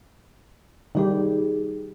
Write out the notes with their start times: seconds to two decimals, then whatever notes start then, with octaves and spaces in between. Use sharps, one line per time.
0.95 D#3 G3 D#4 G4 G#4